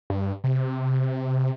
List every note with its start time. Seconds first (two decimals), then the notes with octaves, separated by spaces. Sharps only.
0.10 G2
0.44 C3